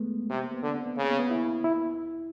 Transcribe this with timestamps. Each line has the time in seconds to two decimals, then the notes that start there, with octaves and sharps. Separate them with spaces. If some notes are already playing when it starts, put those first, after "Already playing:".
Already playing: G#3 A3 B3
0.30 C3
0.44 A#3
0.54 B3
0.63 D3 C4
0.75 C4
0.86 B3
0.97 C#3 A#3
1.08 B3
1.19 B3
1.31 E4
1.64 E4